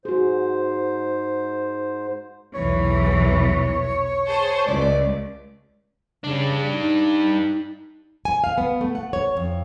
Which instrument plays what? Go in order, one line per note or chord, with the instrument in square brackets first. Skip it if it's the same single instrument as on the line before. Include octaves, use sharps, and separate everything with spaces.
[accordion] G#2 C5 [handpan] F#4 G#4
[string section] B1 E2 E3 [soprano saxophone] C#5
[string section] G#4 C5 A5
[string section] C#2 [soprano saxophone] D5
[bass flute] C#3 [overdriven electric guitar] G3 D4
[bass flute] D#4
[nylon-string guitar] G#5
F5
B3
A3
F#5
C#5
F2